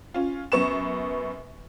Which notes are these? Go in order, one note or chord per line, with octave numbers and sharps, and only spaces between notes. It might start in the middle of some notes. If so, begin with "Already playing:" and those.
C#4 F4
F#2 B3 C#6 E7